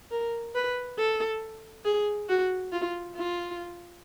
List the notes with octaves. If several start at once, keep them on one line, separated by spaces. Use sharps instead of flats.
A#4
B4
A4
G#4
F#4
F4
F4